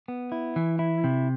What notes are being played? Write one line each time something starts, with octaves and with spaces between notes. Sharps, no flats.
B3
E4
E3
E4
C3